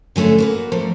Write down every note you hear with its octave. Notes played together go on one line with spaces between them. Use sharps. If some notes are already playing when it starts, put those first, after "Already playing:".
D3 G#3 A3 C#4 E4
A#3 F#4 B4
F3 G3 A3 A#3